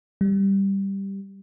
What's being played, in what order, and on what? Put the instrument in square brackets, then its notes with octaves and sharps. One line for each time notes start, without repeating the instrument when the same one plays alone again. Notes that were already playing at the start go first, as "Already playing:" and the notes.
[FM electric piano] G3